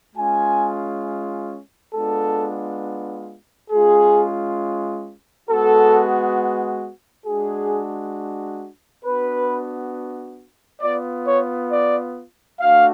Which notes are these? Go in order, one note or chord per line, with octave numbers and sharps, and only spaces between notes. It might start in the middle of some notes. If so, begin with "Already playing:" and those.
G#3 C#4 F4 G#5
G#3 B3 D4 F4 A4
G#3 C#4 F4 G#4
G#3 B3 F#4 A4
G#3 D4 F#4 G#4
B3 D4 F#4 B4
B3 F4 D5
C#5
D5
A3 D4 F#4 F5